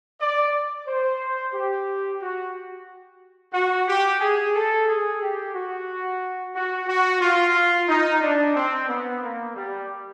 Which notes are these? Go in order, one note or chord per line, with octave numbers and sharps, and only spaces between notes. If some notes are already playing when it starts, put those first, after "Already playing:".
D5
C5
G4
F#4
F#4
G4
G#4
A4
G#4
G4
F#4
F#4
F#4
F4
D#4
D4
C4
B3
A#3
G3